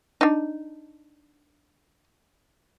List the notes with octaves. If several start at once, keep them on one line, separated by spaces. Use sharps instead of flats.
D4 D#4